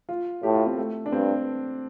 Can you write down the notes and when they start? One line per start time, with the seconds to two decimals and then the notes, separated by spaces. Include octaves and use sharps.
0.09 F4
0.43 A2 G4
0.55 F4
0.66 C4
0.78 A3
1.06 D4
1.12 G2 C4